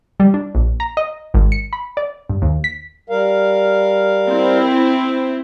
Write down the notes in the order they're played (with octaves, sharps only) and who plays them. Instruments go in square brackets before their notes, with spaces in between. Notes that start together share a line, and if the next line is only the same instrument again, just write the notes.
[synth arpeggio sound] G3
D4
A#1
A#5
D#5
G#1
C#7
B5
D5
G2
D#2
B6
[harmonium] G3 A#4 F5
[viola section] C4 E4